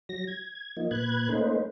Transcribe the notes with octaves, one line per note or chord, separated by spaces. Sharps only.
F#3 A#6
G#6
F3 A#3 D#4
A#2 B4 F#6 G#6
A3 A#3 C#4 D#4 B4 C5